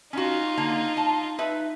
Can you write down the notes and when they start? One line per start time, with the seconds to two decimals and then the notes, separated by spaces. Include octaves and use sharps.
0.13 C#4 D#4 F4 F#4
0.57 D3 A#3 A#5
0.97 A5
1.38 D#4 B4 E5